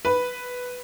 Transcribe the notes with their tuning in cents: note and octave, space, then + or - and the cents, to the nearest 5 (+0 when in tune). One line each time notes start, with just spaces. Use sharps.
B4 +0 B5 +0